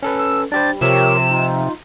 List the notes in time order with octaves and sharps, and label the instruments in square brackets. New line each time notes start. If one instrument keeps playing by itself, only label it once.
[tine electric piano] C#4 A4 B4
[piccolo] E6
[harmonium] G3 [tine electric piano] D4 G4 C5 [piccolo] A6
[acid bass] C3 [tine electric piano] F3 E5 E6 [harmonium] G4 A#4 C#5 [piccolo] E7
[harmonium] D#4 F4